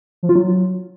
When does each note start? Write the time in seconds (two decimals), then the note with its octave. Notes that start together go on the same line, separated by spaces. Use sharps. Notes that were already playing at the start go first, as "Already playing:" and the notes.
0.23 F3
0.29 F4
0.36 F#3